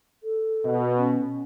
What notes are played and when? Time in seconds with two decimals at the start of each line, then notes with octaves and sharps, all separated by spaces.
0.23 A4
0.65 B2
0.98 C#4